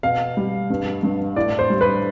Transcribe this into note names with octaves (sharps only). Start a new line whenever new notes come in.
B2 F5
G3
G2
G2
A2 D5
C5
G3
B4